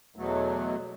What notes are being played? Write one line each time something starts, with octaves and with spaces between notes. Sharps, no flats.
E2 B2 F#3 A3